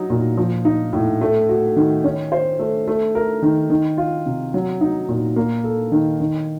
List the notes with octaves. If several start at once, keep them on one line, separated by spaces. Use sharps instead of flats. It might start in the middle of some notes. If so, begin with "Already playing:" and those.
Already playing: F#3 D#4
A#2
F3
D#4
A2
A3
F#4
D#3
C#4
C5
A3
A3
A#4
D#3
D#3
F4
C3
F#3
D#4
A#2
A#3
A4
D#3
D#3